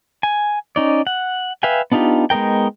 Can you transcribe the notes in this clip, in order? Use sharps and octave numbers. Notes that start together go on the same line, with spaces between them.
G#5
C#4 D#4 D5
F#5
B4 E5 F5 G5 G#5
B3 D4 D#4 F4 G4
G#3 B3 D#4 A#4 G5